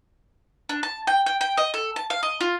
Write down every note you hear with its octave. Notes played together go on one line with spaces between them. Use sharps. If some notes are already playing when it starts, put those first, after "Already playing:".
D4
A5
G5
G5
G5
D#5
A4
A5
F5
D#5
F4